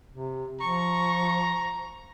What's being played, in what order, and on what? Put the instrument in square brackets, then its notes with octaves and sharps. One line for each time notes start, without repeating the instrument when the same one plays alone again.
[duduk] C3
[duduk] F3 [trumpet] A#5 [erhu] C#6